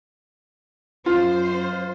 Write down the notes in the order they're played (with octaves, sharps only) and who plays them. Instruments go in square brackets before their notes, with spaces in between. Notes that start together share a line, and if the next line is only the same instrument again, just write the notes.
[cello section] F#2 C5 [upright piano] F4